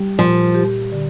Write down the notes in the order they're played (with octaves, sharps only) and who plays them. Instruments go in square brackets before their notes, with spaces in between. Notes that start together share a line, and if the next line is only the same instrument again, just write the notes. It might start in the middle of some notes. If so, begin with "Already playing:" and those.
Already playing: [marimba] G3 G4
[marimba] A#2 [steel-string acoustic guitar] F3
[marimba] G4
D3